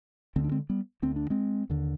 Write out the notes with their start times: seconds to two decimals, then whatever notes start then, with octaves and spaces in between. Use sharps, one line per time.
0.36 D2 D3 C4
0.44 D4
0.52 G#3 C4
0.70 G3 B3
1.02 D2 D3 C4
1.16 D4
1.30 G#3 C4
1.70 D#2 D3